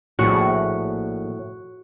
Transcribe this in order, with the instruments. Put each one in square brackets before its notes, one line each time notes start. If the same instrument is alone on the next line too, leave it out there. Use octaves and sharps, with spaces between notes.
[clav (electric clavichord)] A#1 G#4 C#5 [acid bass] A2 [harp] F#4